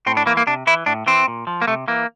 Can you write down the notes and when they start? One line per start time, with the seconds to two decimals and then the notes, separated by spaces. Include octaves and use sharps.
0.06 A2 C4
0.17 D4
0.26 E3 A#3
0.37 A#3
0.47 C3 D4
0.67 E3 E4
0.86 A2 D4
1.07 E3 C4
1.28 A#2
1.47 F3
1.62 A#3
1.68 C3 A3
1.88 E3 A#3